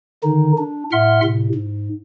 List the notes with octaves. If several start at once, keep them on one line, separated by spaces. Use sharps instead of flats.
D3 D#3 D#4
D4
A2 E5 F#5 C6 F6
A2 C3
G#2